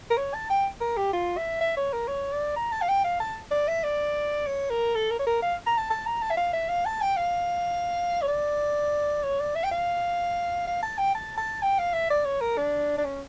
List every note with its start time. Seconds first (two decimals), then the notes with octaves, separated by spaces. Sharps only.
0.11 A#4
0.17 C#5
0.34 A5
0.50 G5
0.81 A#4
0.97 G4
1.13 F4
1.37 E5
1.61 E5
1.77 C#5
1.93 A#4
2.08 C#5
2.32 D5
2.56 A#5
2.72 A5
2.82 F5
2.88 G5
3.04 F5
3.20 A5
3.51 D5
3.68 E5
3.83 D5
4.46 C#5
4.70 A#4
4.95 A4
5.10 A#4
5.19 C#5
5.27 A#4
5.42 F5
5.66 A#5
5.78 A5
5.90 A5
6.06 A#5
6.22 A5
6.31 E5
6.37 F5
6.53 E5
6.69 F5
6.85 A5
7.01 G5
7.16 F5
8.22 C#5
8.28 D5
9.23 C#5
9.40 D5
9.55 E5
9.64 G5
9.71 F5
10.67 F5
10.83 A5
10.98 G5
11.15 A5
11.37 A5
11.62 G5
11.78 F5
11.93 E5
12.10 D5
12.25 C#5
12.41 A#4
12.57 D4
12.98 D4
13.05 C#4